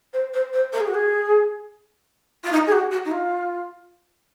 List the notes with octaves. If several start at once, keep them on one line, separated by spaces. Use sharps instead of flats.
C5
C5
C5
A#4
G#4
F#4
G#4
F4
D#4
G#4
F#4
F#4
D#4
F4